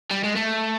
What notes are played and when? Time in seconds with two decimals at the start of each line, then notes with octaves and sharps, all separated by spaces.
0.11 G3
0.24 G#3
0.36 A3